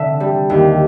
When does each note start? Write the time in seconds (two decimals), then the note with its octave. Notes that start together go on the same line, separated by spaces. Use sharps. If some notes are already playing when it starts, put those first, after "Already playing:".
Already playing: D3 C4 E5
0.20 G3
0.50 D#2